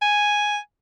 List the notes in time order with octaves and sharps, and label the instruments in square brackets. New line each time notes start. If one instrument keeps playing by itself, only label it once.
[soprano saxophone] G#5